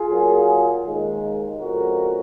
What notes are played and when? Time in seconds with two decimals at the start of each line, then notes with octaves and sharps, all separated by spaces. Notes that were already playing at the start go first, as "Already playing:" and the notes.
Already playing: F4 G#4
0.10 A#2 F#3 A#3
0.85 D#2 D#3 G#3
1.60 F2 C#3 G#3 F#4 A#4